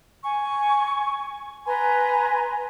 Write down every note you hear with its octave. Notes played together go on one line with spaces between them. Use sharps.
G#5 C#6
B4 G#5 A#5 C6